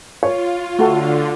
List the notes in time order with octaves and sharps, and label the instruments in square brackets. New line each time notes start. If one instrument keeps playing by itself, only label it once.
[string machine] F4 [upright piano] C#5
[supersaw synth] D3 [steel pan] A3 F#4 A4